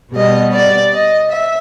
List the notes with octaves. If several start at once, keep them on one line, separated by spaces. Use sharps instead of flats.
B2 G3 B3 D#5
D5
D#5
E5